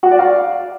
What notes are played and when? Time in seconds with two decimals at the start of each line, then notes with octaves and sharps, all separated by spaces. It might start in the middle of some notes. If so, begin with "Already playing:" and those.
0.03 F#4
0.11 D5
0.19 F5